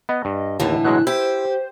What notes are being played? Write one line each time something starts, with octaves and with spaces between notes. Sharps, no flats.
B3 D#5
G2
D#2 A2 D3 E3
B2 F#3 G#3 F#6
E4 G4 C5